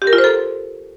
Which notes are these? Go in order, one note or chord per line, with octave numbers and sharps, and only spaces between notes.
G4
A#4
F4
C5
A4